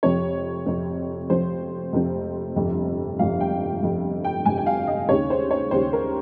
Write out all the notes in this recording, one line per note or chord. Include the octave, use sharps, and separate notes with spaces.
F2 C3 F3 C4 C#5
F2 C3 F3 C4
F2 C3 F3 C4 C5
F2 C3 F3 C4
G1 F2 C3
G1 F2 C3 F5
G5
G1 F2 C3
G5
G1 F2 C3 G#5
G5
F5
D#5
D#2 C#3 G3 C#5
C5
C#5
D#2 C#3 G3 C5
A#4